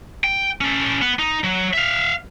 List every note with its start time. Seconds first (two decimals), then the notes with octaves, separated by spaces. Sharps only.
0.24 G5
0.61 C#4 A4
1.02 B3
1.19 D#4
1.44 F#3
1.73 E5 F5